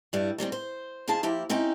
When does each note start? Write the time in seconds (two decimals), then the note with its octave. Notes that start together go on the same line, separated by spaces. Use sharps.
0.13 G2 G3 E4
0.38 D#3 G3 B3 C4
0.52 C5
1.08 F3 D#4 G#4 F5 A5
1.23 F3 A#3 E4 G4
1.50 C4 C#4 D#4 E4 G5